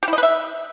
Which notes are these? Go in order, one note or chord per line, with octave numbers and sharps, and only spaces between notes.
G4
E4
D#5
B4
E5